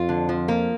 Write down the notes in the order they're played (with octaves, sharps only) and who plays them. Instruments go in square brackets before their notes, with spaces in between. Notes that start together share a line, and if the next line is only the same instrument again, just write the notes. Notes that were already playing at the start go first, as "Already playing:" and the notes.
Already playing: [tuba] F2 [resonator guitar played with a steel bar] F4
[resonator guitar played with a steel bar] D3
F3
A#3